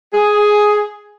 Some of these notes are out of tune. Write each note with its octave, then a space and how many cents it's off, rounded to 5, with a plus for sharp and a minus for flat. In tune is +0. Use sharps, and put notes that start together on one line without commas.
G#4 +5